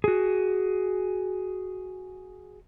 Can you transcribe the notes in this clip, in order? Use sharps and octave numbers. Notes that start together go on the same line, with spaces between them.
F#4 G#4